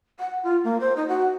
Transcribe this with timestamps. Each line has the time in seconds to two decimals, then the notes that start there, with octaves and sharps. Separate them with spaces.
0.20 F#5
0.43 F4
0.64 A#3
0.81 C5
0.97 D#4
1.08 F#4